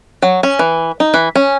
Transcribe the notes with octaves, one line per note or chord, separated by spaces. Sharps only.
F#3
C#4
E3
D#4
E3
C#4